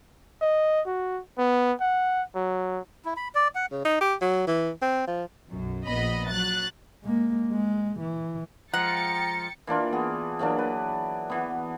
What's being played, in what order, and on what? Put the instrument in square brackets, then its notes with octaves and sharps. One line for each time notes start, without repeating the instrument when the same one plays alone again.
[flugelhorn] D#5
F#4
B3
F#5
F#3
[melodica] E4
B5
D5
F#5
[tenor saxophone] C#3
D#4
G4
F#3
E3
C4
F3
[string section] B1 F#2
A#1 B3 D#5 B5
F#3 F#6 A6
[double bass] G#3 A#3
G#3
E3
[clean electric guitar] F3 G#3 F4 [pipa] F#5 [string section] G5 A6 C#7 [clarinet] A#5
[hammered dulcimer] E3 A#3 D4 F4
B3 G#4
E3 F#3 A#3 D4
B4
E3 B3